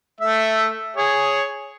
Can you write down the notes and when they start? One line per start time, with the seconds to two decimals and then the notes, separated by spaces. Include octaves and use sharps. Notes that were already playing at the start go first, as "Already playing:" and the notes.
0.21 A3 E5
0.96 G#4 C#5